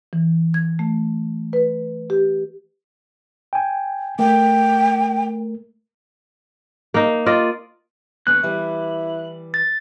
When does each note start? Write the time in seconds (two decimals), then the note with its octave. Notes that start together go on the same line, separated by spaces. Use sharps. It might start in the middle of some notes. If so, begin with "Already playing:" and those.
0.13 E3
0.54 G#6
0.79 A3
1.53 B4
2.10 G4
3.53 G5 G#5
4.19 A3 A#4 G5
6.94 A#3 D#4
7.26 F4 D5 D#5
8.27 D3 B3 C#4 F#6
8.43 E3 G3 E4
9.54 A6